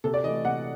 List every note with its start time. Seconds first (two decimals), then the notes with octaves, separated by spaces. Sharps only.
0.04 C3 A4
0.14 D5
0.24 E3 D#5
0.28 A3
0.45 C3 F#5